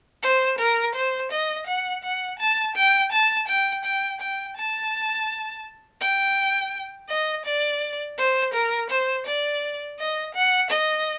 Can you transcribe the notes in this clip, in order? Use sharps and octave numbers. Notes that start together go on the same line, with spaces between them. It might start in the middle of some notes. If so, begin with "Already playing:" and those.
C5
A#4
C5
D#5
F#5
F#5
A5
G5
A5
G5
G5
G5
A5
G5
D#5
D5
C5
A#4
C5
D5
D#5
F#5
D#5